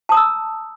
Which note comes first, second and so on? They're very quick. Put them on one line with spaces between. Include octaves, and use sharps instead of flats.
A5 D#6 A#5 E6